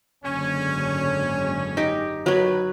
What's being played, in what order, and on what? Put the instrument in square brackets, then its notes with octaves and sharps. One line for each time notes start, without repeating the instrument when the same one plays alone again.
[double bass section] F#1 G#2 D3 [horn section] C#4
[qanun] D#4 G4
[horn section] D#3 B4 [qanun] F#3 C#5